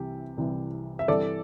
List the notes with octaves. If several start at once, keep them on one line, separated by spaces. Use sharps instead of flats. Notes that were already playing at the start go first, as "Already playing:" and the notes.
Already playing: C2 C3 E3 G4
C2 C3 E3
E5
G2 E3 G3 C4 A4 D5